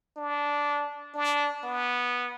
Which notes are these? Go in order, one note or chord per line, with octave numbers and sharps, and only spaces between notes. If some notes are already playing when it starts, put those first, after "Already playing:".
D4
D4
B3